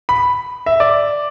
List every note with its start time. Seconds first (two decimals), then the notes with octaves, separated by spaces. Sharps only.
0.09 B5
0.66 E5
0.80 D5